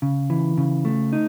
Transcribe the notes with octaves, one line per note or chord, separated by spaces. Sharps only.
C#3
E3
C#3
A3
D#4